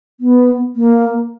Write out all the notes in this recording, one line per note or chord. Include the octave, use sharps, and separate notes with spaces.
B3
A#3